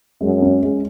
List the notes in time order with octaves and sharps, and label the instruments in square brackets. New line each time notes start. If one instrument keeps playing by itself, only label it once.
[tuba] F#2 [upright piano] G#3
[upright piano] C#4
G#3